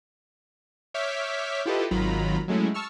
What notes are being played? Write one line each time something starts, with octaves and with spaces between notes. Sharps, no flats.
C#5 E5 D6 F6 G6 B6
E4 F4 G4 A4 B4 D#5
G#1 D#3 F#3 F4 A#5 B5
F#3 G#3 A3 C#4 E4
A5 C#6 E6 F6